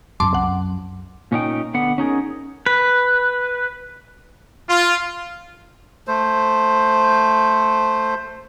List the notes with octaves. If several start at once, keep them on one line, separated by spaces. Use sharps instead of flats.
F#2 F#3 A5 C6 D6
C2 F#5
A#2 C#4 D#4 G5
D3 B3 F#5
C#4 D#4 G#4 A#4
B4
F4
A3 C5